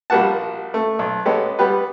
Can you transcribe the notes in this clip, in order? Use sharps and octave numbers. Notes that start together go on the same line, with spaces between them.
A#1 G3 A#3 F#4 F#5 A5
A3
B1
G#3 B3 C#4 G4 A4
G3 B3 G4 B4